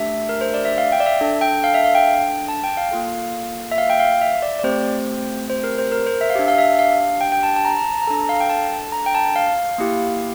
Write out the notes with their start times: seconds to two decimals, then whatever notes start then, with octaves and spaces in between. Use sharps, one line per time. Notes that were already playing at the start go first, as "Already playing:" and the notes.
Already playing: A3 D4 G4 E5
0.29 A#4
0.41 C5
0.54 D5
0.65 E5
0.78 F5
0.92 G5
1.00 D5
1.06 E5
1.21 D4 A4
1.41 G5
1.64 F5
1.74 E5
1.85 F5
1.95 G5
2.48 A5
2.64 G5
2.77 F5
2.91 A#3 F4 A4
3.71 E5
3.78 F5
3.90 G5
4.00 F5
4.21 E5
4.42 D5
4.59 D5
4.64 A3 C4 G4 C5
5.50 C5
5.64 A#4
5.78 C5
5.92 A#4
6.07 C5
6.21 E5
6.30 F5
6.35 D4 G4 E5
6.48 F5
6.58 E5
6.79 F5
7.21 G5
7.32 G5
7.43 A5
7.56 A5
7.65 A#5
7.78 A#5
7.93 A5
8.02 A#5
8.07 D4 A4 A5
8.29 F5
8.40 G5
8.49 A5
8.92 A#5
9.06 G5
9.15 A5
9.36 F5
9.78 A#3 E4 G4